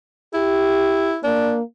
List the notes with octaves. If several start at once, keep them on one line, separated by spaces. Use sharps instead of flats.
E4 G4
A#3 D4